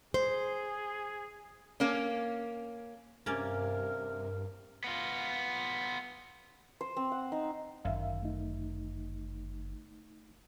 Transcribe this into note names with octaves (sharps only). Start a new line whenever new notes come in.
G#4 C5
A#3 C#4
G2 C3 A#3 C#4 A#4 D5
B3 F4
C5
C4
F#5
D#4
G1 F#2 D#3 E5 F5
A3 D#4